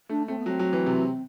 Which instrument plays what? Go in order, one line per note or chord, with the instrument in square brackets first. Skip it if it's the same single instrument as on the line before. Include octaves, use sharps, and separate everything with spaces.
[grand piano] A3 [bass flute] D4
[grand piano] A3 [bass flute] C4
[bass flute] B3
[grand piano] F#3 [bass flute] C4
[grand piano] F#3
E3
C3